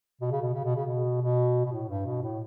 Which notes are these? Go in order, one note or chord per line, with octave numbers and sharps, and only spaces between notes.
B2
C#3
B2
C#3
B2
C#3
B2
B2
B2
A2
G2
B2
A2